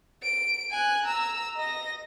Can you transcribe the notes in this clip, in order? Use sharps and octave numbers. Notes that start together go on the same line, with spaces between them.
D7
G#5 F#6
A#5 E6
D#5 A#6